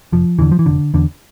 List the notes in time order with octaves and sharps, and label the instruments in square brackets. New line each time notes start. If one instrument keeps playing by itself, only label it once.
[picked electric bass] F1 F3
E2 D3 E3
F3
E3
F1 D3
E2 D3